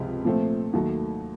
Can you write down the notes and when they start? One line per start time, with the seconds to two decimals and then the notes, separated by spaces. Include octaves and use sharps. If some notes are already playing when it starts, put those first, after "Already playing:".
Already playing: C#2 C3 F3 G#3
0.25 A#2 F3 A3 C4
0.73 D#2 D#3 F#3 A3